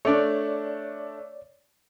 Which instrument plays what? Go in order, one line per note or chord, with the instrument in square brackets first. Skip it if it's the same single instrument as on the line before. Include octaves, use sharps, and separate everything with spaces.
[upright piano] A3 D4 [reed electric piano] C#5 D5